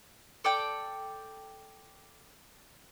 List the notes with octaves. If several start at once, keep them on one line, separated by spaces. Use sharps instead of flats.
A4 D5 G5